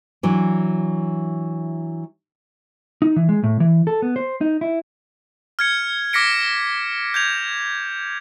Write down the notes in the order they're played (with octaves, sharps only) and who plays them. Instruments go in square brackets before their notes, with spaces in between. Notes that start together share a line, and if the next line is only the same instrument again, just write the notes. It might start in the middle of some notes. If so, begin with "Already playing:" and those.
[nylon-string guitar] E3 F#3 D4
[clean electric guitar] D#4
E3
G#3
A2
E3
A4
B3
C5
D#4
E4
[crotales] F6 G#6 C#7
D6 F6 A#6 B6 C#7 D7
G6 G#6 F7